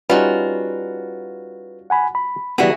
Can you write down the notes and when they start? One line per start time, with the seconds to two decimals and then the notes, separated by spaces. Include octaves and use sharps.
0.10 G3 C#4 D#4 F4 F#4 B4
1.90 F#5 G#5 B5
2.15 B5
2.58 E3 G3 B3 E4 F#4 G#4